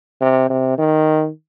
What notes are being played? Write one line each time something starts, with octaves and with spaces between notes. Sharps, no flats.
C3
C3
D#3